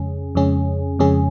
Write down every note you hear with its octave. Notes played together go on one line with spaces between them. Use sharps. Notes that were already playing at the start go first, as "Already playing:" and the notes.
Already playing: F2 C#3 G#3 C#4 G#4
F2 C#3 G#3 C#4 G#4
F2 C#3 G#3 C#4 G#4